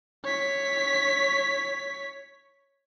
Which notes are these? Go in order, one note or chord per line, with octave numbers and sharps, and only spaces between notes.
C#5 B6